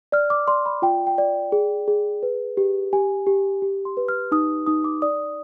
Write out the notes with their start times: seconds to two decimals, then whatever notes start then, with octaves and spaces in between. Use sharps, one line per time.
0.12 D5 F6
0.30 D6
0.48 D5 C6
0.66 B5
0.82 F4 G5
1.07 G5
1.18 D5
1.52 G#4
1.88 G#4
2.23 B4
2.57 G4
2.93 G4 G#5
3.27 G4
3.62 G4
3.85 C6
3.97 B4
4.08 F6
4.32 D#4 D#6
4.67 D#4 D#6
4.84 D6
5.02 D5 D#6